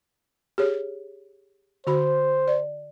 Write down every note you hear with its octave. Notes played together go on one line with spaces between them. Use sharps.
G4 G#4 C#5
D3 F#4 C5 B5
D5